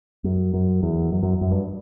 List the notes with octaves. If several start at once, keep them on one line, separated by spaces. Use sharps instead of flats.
F#2
F#2
E2
F#2
F#2
F#2
G2